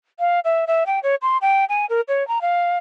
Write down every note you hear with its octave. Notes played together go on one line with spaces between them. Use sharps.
F5
E5
E5
G5
C#5
C6
G5
G#5
A#4
C#5
A#5
F5